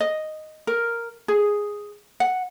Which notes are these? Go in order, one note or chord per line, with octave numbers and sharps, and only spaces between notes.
D#5
A#4
G#4
F#5